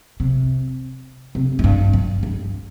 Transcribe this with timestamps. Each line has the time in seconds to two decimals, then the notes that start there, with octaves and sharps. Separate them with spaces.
0.20 C3
1.35 C3
1.59 A2
1.64 G2
1.93 G2
2.23 G2